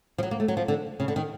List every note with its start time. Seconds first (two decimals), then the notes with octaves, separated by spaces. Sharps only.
0.18 F3
0.23 F#3
0.31 A#3
0.40 A3
0.48 F#3
0.57 F3
0.68 D3
1.00 C#3
1.08 D3
1.16 D#3